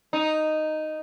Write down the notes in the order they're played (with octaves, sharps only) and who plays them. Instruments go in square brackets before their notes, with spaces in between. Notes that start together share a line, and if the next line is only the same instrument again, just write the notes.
[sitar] D#4